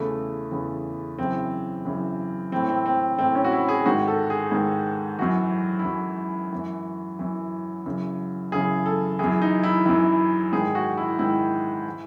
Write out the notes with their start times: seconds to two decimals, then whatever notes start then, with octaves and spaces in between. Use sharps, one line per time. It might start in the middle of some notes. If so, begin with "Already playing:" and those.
Already playing: E2 C#3 E3 A3
0.52 E2 C#3 E3
1.18 F#2 C#3 E3 C4
1.85 F#2 C#3 E3
2.52 A2 E3 C4
2.69 C4
2.86 C4
3.18 A2 E3 C4
3.35 C#4
3.44 F#4
3.52 E4
3.69 G#4
3.86 G#2 D#3 F#4
4.08 A4
4.30 G#4
4.52 G#2 D#3
5.19 F#2 E3 F#4
5.79 E4
5.85 F#2 E3 F#4
6.53 F#2 E3
7.19 F#2 E3
7.86 F#2 C#3 E3
8.52 F#2 C#3 E3 G#4
8.86 A4
9.19 F#2 E3 G#4
9.42 D#4
9.63 E4
9.85 F#2 E3 E4
10.52 G#2 D#3 G#4
10.75 F#4
10.97 E4
11.19 G#2 D#3 E4
11.90 E3